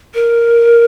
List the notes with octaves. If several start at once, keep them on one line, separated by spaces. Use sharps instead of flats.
A#4